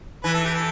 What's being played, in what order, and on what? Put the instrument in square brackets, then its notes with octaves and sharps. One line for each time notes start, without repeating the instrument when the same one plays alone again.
[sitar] E3 [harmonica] B4
[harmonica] A4
G4
A4